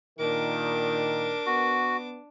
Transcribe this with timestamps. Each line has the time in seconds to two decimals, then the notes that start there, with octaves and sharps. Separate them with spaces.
0.19 A#2 D#3 D4 A#4 D6
1.46 B3 F#4